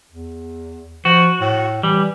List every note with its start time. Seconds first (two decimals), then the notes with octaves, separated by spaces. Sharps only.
0.12 E2
1.05 F3 F#4
1.41 A2
1.83 E3 G3